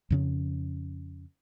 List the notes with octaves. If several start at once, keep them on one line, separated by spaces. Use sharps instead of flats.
F2 C#3 C#4